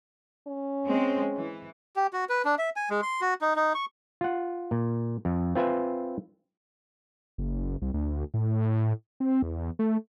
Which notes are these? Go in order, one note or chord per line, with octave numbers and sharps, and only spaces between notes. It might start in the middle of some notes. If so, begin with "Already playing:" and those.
C#4
G#3 C4
E3
G4
F#4
B4
D4
E5
G#5
G#3
C6
F#4
D#4
D#4
C#6
F4 F#5
A#2
F2
C4 F4 B4 E5 G#5
F#1
C2
D2
A2
C4
E2
A3